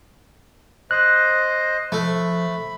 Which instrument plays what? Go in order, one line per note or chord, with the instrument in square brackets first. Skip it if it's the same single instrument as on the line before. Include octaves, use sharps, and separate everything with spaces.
[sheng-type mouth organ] C5 D#5 [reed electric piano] F#6
[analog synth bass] F3 [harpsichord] A3 [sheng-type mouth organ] B5